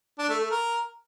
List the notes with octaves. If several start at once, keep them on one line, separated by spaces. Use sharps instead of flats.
D4
A3
A3
A#4